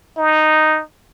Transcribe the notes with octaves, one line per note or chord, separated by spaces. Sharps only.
D#4